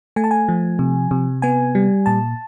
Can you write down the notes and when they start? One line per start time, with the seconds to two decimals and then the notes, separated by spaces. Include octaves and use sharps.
0.16 A3 G#5
0.24 A5
0.31 G#5
0.48 F3
0.79 C3
1.11 C3
1.42 B3 G#5
1.75 G3
2.06 A#2 A5